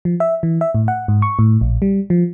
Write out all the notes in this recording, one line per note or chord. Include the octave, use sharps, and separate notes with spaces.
F3
E5
E3
E5
A2
F#5
G#2
C#6
A2
A#1
G3
F3